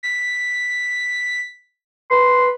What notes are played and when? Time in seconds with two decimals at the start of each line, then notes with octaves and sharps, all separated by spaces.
0.03 B6
2.10 B4 C6